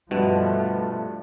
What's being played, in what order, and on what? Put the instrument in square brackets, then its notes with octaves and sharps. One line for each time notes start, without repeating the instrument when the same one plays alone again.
[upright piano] G2 [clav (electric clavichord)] B2 [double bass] F3 A3